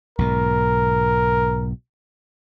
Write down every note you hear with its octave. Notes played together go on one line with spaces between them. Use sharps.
B1 G#2 B2 A#4